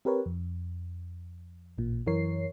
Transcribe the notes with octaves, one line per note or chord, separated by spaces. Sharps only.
C4 G4 A#4 B4 C#5
F2
A1 A#2
F#2 E3 A#4 C#5 C7